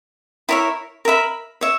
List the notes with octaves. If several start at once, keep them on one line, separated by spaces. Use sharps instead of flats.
E4 A#4 C#5 E5
A#4 E5 B5
C#5 E5